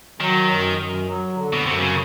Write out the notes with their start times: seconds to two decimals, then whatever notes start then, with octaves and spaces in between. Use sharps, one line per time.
0.20 D#3 F#3
0.49 F#2
0.77 F#2
1.07 F#3
1.36 D3
1.53 B2
1.65 F#2 C3
1.80 C#3